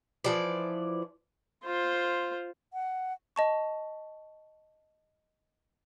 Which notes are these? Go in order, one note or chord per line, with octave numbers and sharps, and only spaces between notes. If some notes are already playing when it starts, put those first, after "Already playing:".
E3 F3 D5
F4 C5
F#5
D#5 A5 C#6